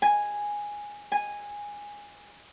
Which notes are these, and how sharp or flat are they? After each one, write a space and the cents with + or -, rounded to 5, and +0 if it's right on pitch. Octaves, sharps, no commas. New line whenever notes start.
G#5 -5
G#5 -10